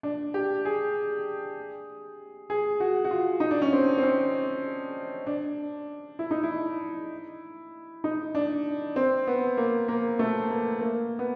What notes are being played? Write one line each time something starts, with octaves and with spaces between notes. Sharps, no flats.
D4
G4
G#4
G#4
F#4
F#4
F4
D#4
D4
C#4
C4
C4
C#4
D4
E4
D#4
E4
D#4
D4
C4
B3
A#3
A#3
A3
A#3
A#3
B3